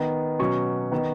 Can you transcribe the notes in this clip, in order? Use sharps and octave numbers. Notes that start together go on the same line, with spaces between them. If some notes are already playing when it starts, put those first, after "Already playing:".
Already playing: D#3 B3
B2 F#3 C#4 C#6
D#3 B3